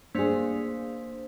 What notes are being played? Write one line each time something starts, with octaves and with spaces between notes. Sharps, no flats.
A#3 D4 G#4 C5 B6